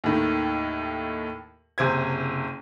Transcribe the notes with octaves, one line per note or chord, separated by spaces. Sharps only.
D#2 A2 D#3
F#1 C3 C5 G#6